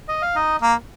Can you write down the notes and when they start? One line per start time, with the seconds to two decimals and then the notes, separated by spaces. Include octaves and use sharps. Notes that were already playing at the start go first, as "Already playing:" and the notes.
0.08 D#5
0.22 F5
0.36 D#4 D#5
0.61 A#3